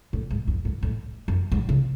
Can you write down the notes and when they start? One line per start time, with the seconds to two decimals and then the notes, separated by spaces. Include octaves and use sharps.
0.13 A2
0.30 G#2
0.47 E2
0.65 G#2
0.83 A2
1.28 F#2
1.52 G#2
1.69 C#3